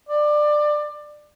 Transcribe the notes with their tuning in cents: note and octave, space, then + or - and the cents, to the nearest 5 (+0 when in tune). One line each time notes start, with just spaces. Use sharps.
D5 +20